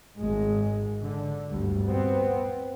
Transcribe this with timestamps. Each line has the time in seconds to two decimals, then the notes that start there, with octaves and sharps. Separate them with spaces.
0.17 G#1 G#3
1.02 D3
1.51 G1 D2 G3
1.87 B3 C4